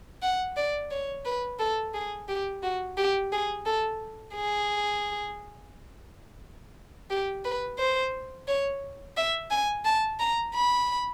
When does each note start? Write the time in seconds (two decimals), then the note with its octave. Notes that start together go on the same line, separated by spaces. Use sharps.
0.22 F#5
0.56 D5
0.91 C#5
1.25 B4
1.59 A4
1.94 G#4
2.28 G4
2.63 F#4
2.97 G4
3.32 G#4
3.66 A4
4.35 G#4
7.10 G4
7.45 B4
7.79 C5
8.48 C#5
9.16 E5
9.51 G#5
9.85 A5
10.19 A#5
10.54 B5